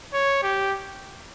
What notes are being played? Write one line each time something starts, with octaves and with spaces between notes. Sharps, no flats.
C#5
G4